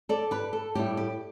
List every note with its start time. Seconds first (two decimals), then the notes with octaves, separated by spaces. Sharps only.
0.09 A4 D5
0.31 G4 B4
0.53 A4
0.75 A2 G3 E4 G4
0.97 G4